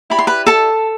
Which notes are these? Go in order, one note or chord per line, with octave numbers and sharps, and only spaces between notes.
E4 G4 D5 B5
C6
B4 B5
A4 A5